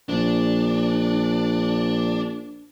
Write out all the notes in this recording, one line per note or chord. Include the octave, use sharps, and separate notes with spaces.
A#1 D4